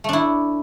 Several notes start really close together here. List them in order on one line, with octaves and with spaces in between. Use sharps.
A3 D4 E4